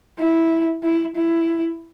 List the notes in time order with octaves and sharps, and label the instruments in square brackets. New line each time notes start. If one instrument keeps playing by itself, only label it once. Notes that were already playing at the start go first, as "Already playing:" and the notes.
[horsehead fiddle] E4
E4
E4